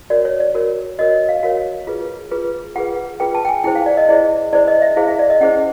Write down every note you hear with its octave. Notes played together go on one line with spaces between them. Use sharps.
F#4 A#4 C#5 D5
C#5
D5
F#4 A#4 C#5
F#4 A#4 C#5 D#5
F5
F#4 A#4 C#5 F5
F4 G#4 B4
F4 G#4 B4
F4 G#4 B4 F#5
F4 G#4 B4 G5
A5
G5
G#5
E4 G#4 C5 G5
F5
D5
D#5
E4 G#4 C5 D5
E4 G#4 C5 D5
D#5
E5
E4 G#4 C5 F5
E5
D5
D#5
C#4 E4 G#4 C5 F#5